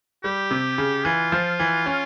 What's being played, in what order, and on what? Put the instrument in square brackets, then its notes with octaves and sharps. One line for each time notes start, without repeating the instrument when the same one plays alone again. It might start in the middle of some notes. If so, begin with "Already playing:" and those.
[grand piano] G3 [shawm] G4
[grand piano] C3
C#3
[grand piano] E3 [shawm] F4
[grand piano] F3
E3
C#4